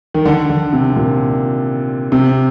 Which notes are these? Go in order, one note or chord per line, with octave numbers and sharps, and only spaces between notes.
D#3
D3
D3
C3
A#2
C3